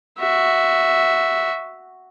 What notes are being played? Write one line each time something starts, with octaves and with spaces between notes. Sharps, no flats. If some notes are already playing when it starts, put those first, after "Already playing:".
F#4 E5